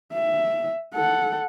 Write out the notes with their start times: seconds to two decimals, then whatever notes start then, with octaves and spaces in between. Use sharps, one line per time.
0.13 E5
0.94 A4 F#5